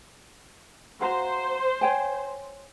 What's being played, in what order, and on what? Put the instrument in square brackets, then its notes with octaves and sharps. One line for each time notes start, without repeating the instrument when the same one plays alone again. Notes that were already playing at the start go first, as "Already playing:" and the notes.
[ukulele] F#4 F5 A#5 [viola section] C5
[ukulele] C#5 G5 G#5